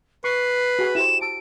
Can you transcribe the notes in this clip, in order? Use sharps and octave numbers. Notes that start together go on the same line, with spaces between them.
B4 C#6 C7
F#4 G#4 G#5
E4 G4 C5 E7
A5 E6 D7